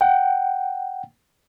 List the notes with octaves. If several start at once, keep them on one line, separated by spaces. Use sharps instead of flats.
F#5 G5